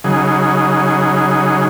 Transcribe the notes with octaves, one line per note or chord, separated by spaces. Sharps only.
C#3 F#3 D#4 G#4